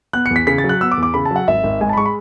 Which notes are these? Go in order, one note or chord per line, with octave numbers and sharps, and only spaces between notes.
B3 F#6
E2 C#7
B6
C#3 B6
A6
F#3
F#6
B3 E6
D6
E2
D6
C#3 B5
A5
F#3
F#5
G#1 E5
G#1
G#2 G#5
A5
B5
G#3 C#6
B5